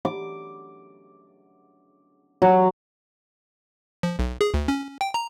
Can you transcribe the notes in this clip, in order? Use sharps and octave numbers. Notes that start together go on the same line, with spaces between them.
D6
F#3
F3
B1
G#4
D2
C#4
G5
A#5